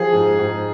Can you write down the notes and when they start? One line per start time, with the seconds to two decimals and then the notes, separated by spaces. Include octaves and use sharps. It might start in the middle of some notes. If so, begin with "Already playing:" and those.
Already playing: F3 G#4
0.13 G#2
0.39 G#2